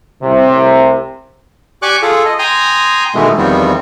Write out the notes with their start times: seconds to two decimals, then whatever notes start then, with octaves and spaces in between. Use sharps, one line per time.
0.23 C2 A2 C3
1.82 G4 D5 G#5 C#6 D6 F#6
2.02 F4 G#4 A4
2.25 D#5
2.39 G5 G#5 A#5 C6 D#6
3.15 B2 D#3 E3 G#3 A3
3.38 E2 D#3 F3 G3 B3 C4